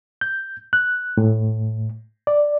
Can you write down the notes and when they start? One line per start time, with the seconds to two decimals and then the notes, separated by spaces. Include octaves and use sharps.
0.21 G6
0.73 F#6
1.17 A2
2.27 D5